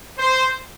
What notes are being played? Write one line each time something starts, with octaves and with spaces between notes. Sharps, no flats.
C5